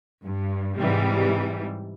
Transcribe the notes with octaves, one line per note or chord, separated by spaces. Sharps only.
G2
G#2 C3 E3 G3